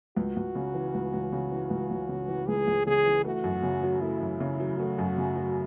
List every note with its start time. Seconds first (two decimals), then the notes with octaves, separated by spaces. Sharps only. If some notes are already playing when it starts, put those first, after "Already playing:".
0.17 C#2 F#4
0.36 C#2
0.55 C#3
0.74 E3
0.94 C#2
1.13 C#2
1.32 C#3
1.51 E3
1.70 C#2
1.91 C#2
2.09 C#3
2.28 E3
2.47 C#2 G#4
2.67 C#2
2.87 C#3 G#4
3.05 E3
3.25 A3 F#4
3.44 F#2
3.63 C#3
3.83 F#3
4.01 A3 E4
4.20 F#2
4.40 C#3
4.60 F#3
4.79 A3 F#4
4.99 F#2
5.18 C#3
5.36 F#3